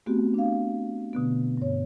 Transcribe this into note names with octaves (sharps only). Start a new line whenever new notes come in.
A3 B3 C4 F#4 G4
D4 F5
B2 D3 B3
G2 C#5